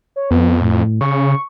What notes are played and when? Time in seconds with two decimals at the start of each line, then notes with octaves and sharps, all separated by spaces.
0.16 C#5
0.31 F2 B3
0.61 A2
1.01 C#3 C#6